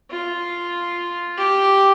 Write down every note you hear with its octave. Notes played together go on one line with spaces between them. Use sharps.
F4
G4